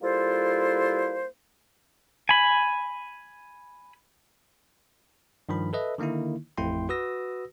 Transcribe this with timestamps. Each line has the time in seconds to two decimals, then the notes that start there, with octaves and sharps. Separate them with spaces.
0.02 G3 A#3 E4 F4 A4 C5
2.29 G#5 B5
5.49 G2 D#3 F3 B5
5.73 A4 B4 D#5 E5
5.98 D3 D#3 A#3 D#4 E4
6.58 A1 F2 A3 E4 G5 C6
6.89 F#4 B4 D#6 E6 A#6